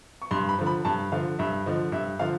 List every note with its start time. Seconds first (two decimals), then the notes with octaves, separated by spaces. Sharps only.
0.22 C#6
0.31 G2 C6
0.49 B5
0.58 D3 F3
0.67 B5
0.85 G2 A5
1.12 D3 F3 F5
1.39 G2 E5
1.66 D3 F3 D#5
1.92 G2 E5
2.19 D3 F3 F5